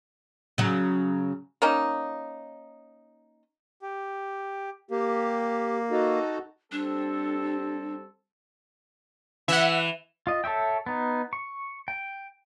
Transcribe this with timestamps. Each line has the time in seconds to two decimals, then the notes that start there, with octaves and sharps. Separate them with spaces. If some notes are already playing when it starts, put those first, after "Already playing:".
0.58 C#3 F#3
1.62 A#3 C#4 D#4
3.82 G4
4.91 A#3 G4
5.91 D#4 F#4 A4
6.72 G3 C4 D4 A4
9.48 E3 E5 F#5
10.27 F4 D#5
10.44 A4 C#5 E5 G5
10.86 B3 D#4
11.33 C#6
11.88 G5